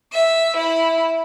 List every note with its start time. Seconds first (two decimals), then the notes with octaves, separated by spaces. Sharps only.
0.12 E5
0.55 E4